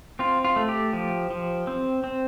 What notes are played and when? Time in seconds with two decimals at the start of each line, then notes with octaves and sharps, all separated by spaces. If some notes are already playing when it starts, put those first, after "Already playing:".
0.19 C4 F4
0.45 F4
0.56 A3
0.69 G4
0.93 F3
1.30 F3
1.67 C4
2.04 C4